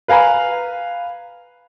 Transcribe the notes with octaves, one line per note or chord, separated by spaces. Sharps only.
B4 F5 G#5 A#5 B5